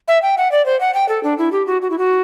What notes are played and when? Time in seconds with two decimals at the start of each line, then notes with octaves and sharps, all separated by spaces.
0.08 E5
0.22 G5
0.38 F#5
0.52 D5
0.66 C5
0.81 F#5
0.94 G5
1.09 A4
1.23 D4
1.38 E4
1.52 G4
1.67 F#4
1.82 F#4
1.90 E4
1.98 F#4